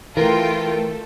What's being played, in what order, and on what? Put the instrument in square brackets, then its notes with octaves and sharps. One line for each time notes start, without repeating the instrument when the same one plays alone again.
[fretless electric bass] E3 [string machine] A3 A4 [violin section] F4 G5 [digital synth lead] A#4